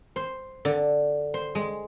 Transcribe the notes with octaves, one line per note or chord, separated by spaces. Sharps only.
C5
D3
C5
G#3